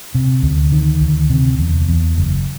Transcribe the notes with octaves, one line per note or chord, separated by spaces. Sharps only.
C3
D2
D#3
D2
C3
E2
E2
F#1